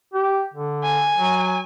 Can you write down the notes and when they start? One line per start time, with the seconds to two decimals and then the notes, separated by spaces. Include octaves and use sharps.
0.14 G4
0.54 D3
0.84 G#5
1.17 F#3